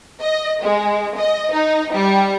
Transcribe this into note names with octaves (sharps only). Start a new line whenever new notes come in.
D#5
G#3
D#5
D#4
G3